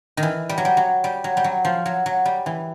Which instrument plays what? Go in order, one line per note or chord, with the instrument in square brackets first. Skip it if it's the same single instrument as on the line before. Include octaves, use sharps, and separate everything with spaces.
[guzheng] D#3
E3
G3
F#3
G3
F#3
G3
F#3
G3
F#3
F3
F#3
F#3
G3
E3